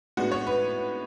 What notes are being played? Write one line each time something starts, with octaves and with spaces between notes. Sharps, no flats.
A2 G#3 B3 D4 F#4
C#5
B4